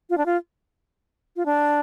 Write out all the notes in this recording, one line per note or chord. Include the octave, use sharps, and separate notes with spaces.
F4
D4
F4
F4
D4